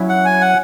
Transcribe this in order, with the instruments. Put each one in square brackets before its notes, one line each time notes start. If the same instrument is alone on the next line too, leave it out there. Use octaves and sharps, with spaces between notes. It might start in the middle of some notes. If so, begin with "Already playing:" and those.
Already playing: [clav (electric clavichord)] F#3 C#4 E4
[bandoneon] F#5
G#5
F#5